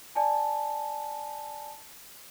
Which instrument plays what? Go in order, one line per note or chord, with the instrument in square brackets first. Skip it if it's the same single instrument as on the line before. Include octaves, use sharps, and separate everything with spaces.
[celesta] D5 G#5 A5